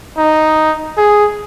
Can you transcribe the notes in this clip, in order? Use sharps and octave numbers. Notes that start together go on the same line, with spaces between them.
D#4
G#4